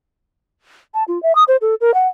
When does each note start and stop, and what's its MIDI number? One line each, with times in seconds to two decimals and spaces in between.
0.94 1.04 81
1.08 1.21 65
1.23 1.35 76
1.35 1.44 87
1.48 1.56 72
1.61 1.75 69
1.81 1.94 70
1.94 2.08 78